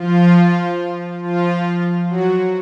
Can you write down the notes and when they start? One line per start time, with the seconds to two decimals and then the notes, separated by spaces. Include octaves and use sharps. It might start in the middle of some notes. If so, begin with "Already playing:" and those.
Already playing: F3 F4
1.22 F3 F4
2.10 F#3 F#4